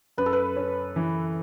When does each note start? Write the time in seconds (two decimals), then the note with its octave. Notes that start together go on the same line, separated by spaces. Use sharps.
0.18 F#2 B4
0.26 A4
0.33 B4
0.56 C#4
0.96 E3